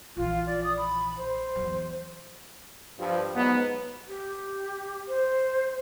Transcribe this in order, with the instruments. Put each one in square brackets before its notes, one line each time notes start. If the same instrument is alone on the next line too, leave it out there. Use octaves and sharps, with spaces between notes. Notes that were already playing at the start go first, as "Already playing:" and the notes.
[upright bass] A#1 E3 [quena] F4
[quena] D5
D#6
B5
C5
[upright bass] E2 F#3
[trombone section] G2 F3
G#2 F#3 B3
[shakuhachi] G4
C5